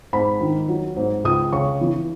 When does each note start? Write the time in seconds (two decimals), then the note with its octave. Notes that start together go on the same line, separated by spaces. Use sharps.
0.13 G#2 B5
0.41 D#3
0.69 F#3
0.96 G#2
1.24 C#2 D#6
1.53 C#3 C#6
1.81 E3